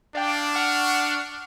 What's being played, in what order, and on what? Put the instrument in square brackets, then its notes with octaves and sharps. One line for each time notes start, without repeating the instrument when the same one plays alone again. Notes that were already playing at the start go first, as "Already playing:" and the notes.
[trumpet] D4 [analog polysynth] D5 F5 G5
[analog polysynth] F#5 C#6 F6